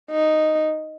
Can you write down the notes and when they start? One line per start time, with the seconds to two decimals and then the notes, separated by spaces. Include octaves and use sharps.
0.11 D#4